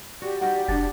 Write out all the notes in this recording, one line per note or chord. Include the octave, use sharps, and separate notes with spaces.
F#4 G4 D5
G3 D#4 F#4 F#5
F1 G2 B3 D4 A6